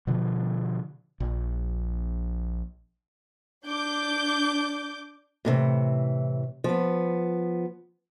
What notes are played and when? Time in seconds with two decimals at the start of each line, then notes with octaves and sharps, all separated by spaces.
0.07 B2 D3 F3
1.20 A#1
3.67 D4 D6 G6
5.45 A2 C3 D#3 E3
6.64 F3 B3